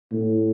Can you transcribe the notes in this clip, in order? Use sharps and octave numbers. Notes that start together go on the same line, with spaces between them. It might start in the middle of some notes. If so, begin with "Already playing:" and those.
A2